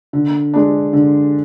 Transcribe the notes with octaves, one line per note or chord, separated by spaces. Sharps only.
D3
G#3 D4
D3